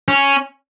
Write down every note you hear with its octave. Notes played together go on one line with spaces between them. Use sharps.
C#4